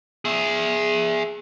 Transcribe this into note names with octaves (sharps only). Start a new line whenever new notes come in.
G#4 E5